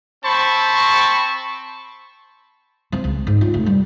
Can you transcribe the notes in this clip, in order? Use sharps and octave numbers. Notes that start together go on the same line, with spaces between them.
C4 C5 A5 B5 C#6
F3 C4
C#2
G#2
F4
F1
G3